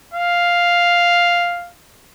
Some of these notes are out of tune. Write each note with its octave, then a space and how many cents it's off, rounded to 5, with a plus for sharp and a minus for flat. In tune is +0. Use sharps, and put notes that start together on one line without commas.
F5 +0